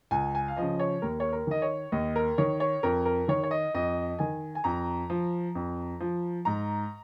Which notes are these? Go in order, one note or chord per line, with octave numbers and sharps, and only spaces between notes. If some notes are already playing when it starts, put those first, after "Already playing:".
C#2 G#5
G#5
F5
C#3 F3 D#5
C#5
D#2 A#4
C#5
A#4
D#3 D#5
C#5
D#2 D#5
A#4
D#3 C#5
C#5
F2 A#4
A#4
D#3 C#5
C#5
D#5
F2 D#5
D#3 G#5
G#5
F2 A#5
F3
F2
F3
G#2 A#5